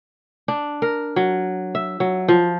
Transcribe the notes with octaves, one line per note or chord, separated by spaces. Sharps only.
D4
A#4
F#3
E5
F#3
F3